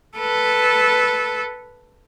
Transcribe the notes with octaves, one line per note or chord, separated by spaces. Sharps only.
A4 B4